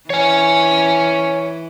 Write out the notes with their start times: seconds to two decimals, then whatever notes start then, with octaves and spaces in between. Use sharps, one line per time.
0.10 E3 C#5 G#5